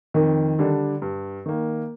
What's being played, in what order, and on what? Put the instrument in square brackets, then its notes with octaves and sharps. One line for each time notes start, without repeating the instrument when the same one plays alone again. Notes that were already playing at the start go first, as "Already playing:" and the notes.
[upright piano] F2 [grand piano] D#3
[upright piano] D3 G3 D4
G2
D#3 A#3